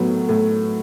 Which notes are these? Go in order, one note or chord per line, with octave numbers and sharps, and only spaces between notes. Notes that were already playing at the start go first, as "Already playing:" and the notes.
Already playing: A2 F#3 B3
A2